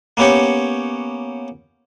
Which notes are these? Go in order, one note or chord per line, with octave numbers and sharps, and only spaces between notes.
A#3 B3 C#4 G4 C#5